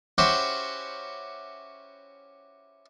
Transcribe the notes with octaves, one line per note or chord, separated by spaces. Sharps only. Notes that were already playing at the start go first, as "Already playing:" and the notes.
C#4 E4 F#4 G4 C5